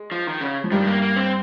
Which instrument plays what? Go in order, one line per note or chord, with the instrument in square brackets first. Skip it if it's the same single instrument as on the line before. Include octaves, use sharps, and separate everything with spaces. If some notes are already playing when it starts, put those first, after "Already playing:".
Already playing: [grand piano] G#3
[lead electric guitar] F3
D#3
C#3
[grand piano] F3
[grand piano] G2 G3 [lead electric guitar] D#3
[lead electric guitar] A#3
A#3
C4